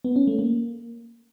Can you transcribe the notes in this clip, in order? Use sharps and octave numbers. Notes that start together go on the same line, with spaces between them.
B3
C#4
A3
A#3